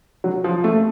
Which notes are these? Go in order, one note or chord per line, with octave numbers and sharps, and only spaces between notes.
F#3
F3
A3